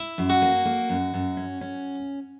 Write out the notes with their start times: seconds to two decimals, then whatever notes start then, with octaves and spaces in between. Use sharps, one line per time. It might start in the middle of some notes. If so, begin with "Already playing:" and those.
Already playing: E4
0.18 F#2
0.30 F#4
0.42 A#3
0.65 A#3
0.89 F#2
1.14 F#2
1.37 C#4
1.61 C#4